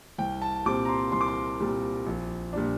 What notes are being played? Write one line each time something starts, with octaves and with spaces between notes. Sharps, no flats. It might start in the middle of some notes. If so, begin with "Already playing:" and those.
C2 G5
A5
A#2 G3 C4 D6
A#5
C6
C2 C6
D6
C6
A#2 G3 C4
A#1
A#2 G3 D4